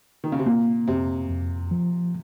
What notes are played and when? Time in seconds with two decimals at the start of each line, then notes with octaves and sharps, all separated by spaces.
0.24 D#3
0.32 C#3
0.39 C3
0.46 A#2 A#3
0.88 F2 C3
1.30 F2
1.71 F3